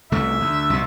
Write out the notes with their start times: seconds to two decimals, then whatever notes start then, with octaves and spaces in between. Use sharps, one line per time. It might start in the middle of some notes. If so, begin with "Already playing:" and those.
0.12 C2 C#3 A3 E5
0.40 D2
0.70 C2 B2